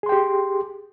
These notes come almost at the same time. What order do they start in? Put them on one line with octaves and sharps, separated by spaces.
G#4 C6 G5 G4